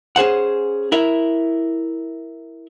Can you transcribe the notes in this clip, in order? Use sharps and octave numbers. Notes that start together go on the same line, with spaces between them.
C#4 G#4 C5 F#5
E4 A#4 E5